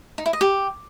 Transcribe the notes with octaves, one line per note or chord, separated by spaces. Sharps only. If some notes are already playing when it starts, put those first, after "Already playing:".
D#4
E4
D#5
G4